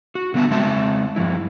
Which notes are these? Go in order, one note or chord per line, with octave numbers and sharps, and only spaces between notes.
F#4
D3 G3 B3 D5 E5 A5
C#3 G#3 C4 E5 A5
G2 F3 E4